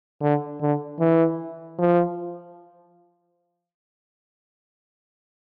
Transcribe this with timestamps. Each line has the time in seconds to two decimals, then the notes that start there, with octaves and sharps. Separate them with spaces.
0.22 D3
0.61 D3
1.00 E3
1.79 F3